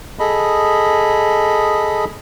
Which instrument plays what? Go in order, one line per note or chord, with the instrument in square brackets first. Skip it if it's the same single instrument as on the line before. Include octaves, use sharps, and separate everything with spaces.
[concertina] G#4 A4 D#5 B5